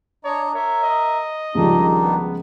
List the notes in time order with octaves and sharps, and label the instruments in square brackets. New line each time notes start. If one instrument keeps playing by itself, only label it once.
[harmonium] D4 D#5 A#5 [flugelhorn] C#5
[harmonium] A#4 E5 [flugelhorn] C#5
[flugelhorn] D#5
[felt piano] C#2 F3 G3 [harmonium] D#3 D4 D#4
[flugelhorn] B3